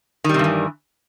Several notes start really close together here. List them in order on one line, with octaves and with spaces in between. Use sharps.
D#3 G3 C3 G2 E3